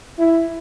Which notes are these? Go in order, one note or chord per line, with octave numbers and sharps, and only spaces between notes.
E4